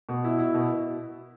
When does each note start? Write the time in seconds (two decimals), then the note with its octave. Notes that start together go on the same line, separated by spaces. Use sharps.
0.09 B2
0.24 E4
0.39 E4
0.54 B2